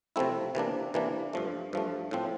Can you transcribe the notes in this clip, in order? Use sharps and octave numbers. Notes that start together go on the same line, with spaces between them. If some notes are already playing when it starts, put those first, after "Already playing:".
C3 F3 A3 C4 E4
C3 E3 A#3 D4
C3 E3 A#3 D4
G2 F3 A3
G2 F3 A3
A2 F3 C4